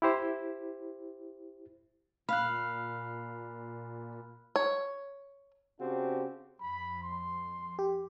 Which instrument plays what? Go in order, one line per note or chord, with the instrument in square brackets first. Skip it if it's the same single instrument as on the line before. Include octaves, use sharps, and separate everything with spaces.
[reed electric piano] E4 G4 C5
[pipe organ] A#2 [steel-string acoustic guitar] F5 [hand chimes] B5 F6 F#6
[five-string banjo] C#5
[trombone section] C#3 C4 D4 F#4 G4
[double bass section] F2 [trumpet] B5
[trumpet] C6
[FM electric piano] G4